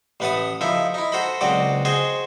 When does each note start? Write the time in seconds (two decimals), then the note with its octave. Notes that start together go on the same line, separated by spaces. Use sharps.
0.20 A1 A3 B4 F#5 A5 D#6
0.61 F3 D#4 E4 A4 E5
0.94 D#4 E4
1.12 F#4 A4 C5 A#5 B5
1.41 C#2 F#3 C4 F#4 D5 D#5
1.85 F#4 G#4 C5 D#5 G#5